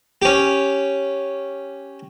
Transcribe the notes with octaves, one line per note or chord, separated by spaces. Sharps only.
C#4 G4